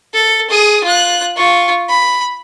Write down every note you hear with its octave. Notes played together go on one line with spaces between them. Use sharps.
A4
G#4 D#6
F4 F#6
F4 C#6
B5